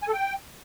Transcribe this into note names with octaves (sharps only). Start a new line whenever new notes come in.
G#5
A4
G5